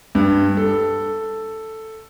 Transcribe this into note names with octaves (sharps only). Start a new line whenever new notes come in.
G2
A4